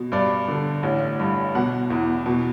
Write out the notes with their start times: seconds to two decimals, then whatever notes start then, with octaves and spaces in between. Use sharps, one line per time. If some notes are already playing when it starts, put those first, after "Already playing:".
Already playing: B2
0.12 G2 D5
0.48 D3
0.83 A1
1.20 G2
1.55 B2 F#5
1.90 E2
2.26 B2